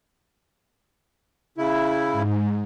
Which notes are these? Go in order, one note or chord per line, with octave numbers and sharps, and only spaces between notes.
C#3 E4
G#2